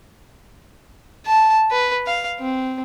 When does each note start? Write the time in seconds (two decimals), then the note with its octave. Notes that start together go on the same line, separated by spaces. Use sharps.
1.26 A5
1.71 B4
2.07 F5
2.40 C4